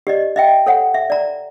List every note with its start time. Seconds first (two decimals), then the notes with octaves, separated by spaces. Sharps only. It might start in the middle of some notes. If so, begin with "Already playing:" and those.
0.07 G4 D5 D#5
0.36 D#5 E5 G5
0.66 A4 C#5 F#5
0.94 E5
1.10 D5 A#5